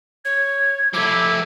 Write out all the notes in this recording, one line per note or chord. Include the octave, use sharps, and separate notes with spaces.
C#5 G#6
F3 A3 E4 D6